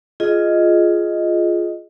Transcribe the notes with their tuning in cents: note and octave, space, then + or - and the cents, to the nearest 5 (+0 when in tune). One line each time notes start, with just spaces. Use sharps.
F4 +0 G#4 +10 D#5 +0